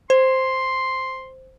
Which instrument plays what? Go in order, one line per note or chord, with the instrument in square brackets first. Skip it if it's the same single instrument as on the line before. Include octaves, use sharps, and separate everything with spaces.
[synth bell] C5 [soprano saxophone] C6